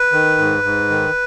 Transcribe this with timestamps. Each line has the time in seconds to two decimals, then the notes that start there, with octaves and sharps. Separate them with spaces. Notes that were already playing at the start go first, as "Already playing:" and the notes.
Already playing: B4
0.12 D#3
0.38 G#2
0.63 G#2
0.90 D#3